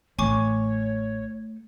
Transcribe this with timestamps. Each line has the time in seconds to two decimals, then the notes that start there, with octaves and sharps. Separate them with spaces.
0.19 A1 A3 C#5 G#5 C#6 D6